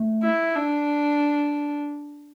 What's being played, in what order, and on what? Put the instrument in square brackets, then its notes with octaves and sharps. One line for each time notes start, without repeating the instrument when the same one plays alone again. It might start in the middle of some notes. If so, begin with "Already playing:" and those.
Already playing: [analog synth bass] A3
[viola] E4
D4